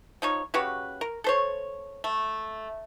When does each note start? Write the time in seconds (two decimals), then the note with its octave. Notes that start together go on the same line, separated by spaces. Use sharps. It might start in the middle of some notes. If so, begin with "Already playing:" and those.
0.22 F3 D#4 C#5
0.54 C#3 F#4 G4 B4
1.01 A#4
1.24 A4 C5 C#5
2.04 A3